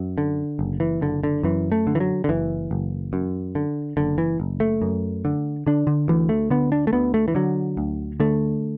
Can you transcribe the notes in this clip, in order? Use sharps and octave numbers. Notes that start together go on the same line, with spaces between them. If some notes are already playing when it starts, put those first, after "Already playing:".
Already playing: F#2
D3
F#1
E3
F#1 D3
D3
F#2 E3
A3
D3
E3
F#3
D3
F#1 E3
F#1
F#2
D3
F#1 D3
E3
F#1
A3
F#2
D3
D3 D4
D3
D2 E3
A3
D3 B3
D4
A3
D2 B3
A3
E3
D3 F#3
D2
D3 A3